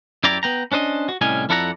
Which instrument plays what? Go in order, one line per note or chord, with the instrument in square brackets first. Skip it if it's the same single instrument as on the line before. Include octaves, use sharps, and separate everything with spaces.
[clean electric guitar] F#2 E4 G4 D5 A#5
B3 G5 A#5
C#4 D4 C5 D#5
F#4
C2 A2 G3 C#4 D#5 G#5
F2 E4 A4 D5 F#5 A#5